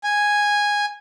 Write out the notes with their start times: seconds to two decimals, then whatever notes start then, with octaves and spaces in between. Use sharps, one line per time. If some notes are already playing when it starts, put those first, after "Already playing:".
0.04 G#5